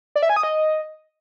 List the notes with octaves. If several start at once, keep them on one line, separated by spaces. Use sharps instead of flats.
D5
E5
G#5
D#6
D#5